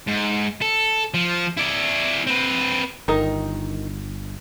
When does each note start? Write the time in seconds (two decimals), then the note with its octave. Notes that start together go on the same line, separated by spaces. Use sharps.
0.08 G#2
0.62 A4
1.14 F3
1.57 E4 D5
2.27 C4 B4
3.08 G1 D#3 D#4 A#4